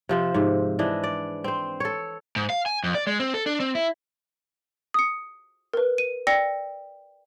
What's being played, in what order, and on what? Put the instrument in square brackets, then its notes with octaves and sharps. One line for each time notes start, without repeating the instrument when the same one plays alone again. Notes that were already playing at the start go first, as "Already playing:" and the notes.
[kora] C3 F3 C5
G#2 C3
E3 D4 D#5
D5
C4 C5
A4 C#5
[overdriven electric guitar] G#2
F5
G#5
F2
D5
G#3
C4
A4
D4
C4
E4
[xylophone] D#6 C#7
A#4 B4
D#7
D5 G5 E6 A#6 C#7